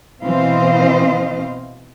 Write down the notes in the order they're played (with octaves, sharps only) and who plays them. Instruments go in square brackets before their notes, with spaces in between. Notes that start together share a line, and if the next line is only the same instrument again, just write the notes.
[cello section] B2 E3 C4 C5 D#5 F5